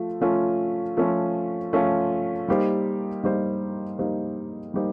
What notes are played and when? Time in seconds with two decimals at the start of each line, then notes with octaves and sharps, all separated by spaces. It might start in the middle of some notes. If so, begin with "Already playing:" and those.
Already playing: F3 A3 F4
0.21 F3 A3 C#4 F4
0.97 F3 A3 C#4 F4
1.73 F3 A3 C#4 F4
2.48 G3 A#3 D#4 G4 C5
3.24 G3 A#3 D#4 G4 C5
3.99 G3 A#3 D#4 G4 C5
4.74 G3 A#3 D#4 G4 C5